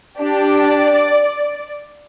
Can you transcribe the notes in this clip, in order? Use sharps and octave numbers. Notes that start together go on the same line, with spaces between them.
D4 G4 D5